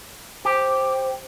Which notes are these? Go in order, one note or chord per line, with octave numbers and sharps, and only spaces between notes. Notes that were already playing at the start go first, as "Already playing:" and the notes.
G4 C5